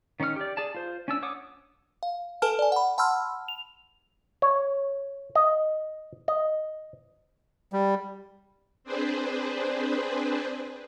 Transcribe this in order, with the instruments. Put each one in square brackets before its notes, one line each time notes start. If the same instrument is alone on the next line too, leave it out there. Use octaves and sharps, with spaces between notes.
[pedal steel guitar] D#3 C#4 D#4 C#6 F6
G4 D5
G#4 D5 A5
F4 C5
C#4 D4 E6
C#5 F#5 D6 D#6
[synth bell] F5
A4 B4 G#5 A5 F6
D5 G#5
F#5 B5
F#5 A5 B5 C6 E6 F6
F7
[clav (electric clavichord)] C#5
D#5
D#5
[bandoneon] G3
[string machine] C4 D4 G#4 B4 C5